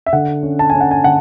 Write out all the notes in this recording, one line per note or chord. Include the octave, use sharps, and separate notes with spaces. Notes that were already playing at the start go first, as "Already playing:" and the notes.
E5
D3 F#5
C#4
A5
G#5
C#4
F#5
G#5
D3 F#5